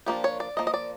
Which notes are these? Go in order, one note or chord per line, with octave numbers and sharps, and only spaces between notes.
F3 A#3 D4 G4
C#5
D5
F3 A#3 D#5
D#5
D5